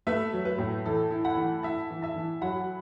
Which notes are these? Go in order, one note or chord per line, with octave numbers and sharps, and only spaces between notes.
A3 B4 E5
F#3
B4
A2
E3 A4
E4
F#5 B5
E3
E4 E5 A5
E3
E5 A5
E3
F#3 F#5 B5